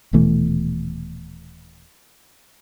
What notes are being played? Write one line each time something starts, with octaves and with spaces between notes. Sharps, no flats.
D#1 B2 E3 A3